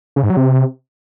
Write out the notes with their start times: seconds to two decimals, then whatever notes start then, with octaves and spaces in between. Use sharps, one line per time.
0.16 C#3
0.23 G#2
0.30 F#3
0.37 C3